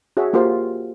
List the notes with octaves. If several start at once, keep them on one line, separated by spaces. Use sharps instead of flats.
F#4 G#4 C#5 E5
A#3 F4 G4 A#4 C5